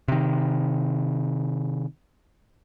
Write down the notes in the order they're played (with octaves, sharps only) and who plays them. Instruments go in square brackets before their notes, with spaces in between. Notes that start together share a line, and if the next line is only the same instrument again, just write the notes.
[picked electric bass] C3 D#3